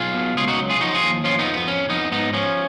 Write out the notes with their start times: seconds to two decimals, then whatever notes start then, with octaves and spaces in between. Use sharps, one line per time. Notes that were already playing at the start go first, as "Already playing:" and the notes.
Already playing: B1 F4 G#4
0.15 B2
0.37 C#2 F4 G#4
0.48 D#4 F#4
0.59 F#3
0.70 F4 G#4
0.81 F3 D#4 F#4
0.95 F4 G#4
1.03 D#2
1.24 F3 C#4 F4
1.39 B3 D#4
1.46 F2
1.54 B3
1.68 F2 C#4
1.89 F2 B3 D#4
2.11 G#2 B3 D#4
2.33 F3 C#4